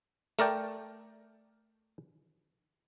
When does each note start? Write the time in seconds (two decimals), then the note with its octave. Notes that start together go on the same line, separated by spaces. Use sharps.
0.39 A3 A#4 D5 G5